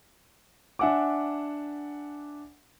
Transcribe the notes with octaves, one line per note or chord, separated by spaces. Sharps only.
D4 E5 F#5 G#5 D6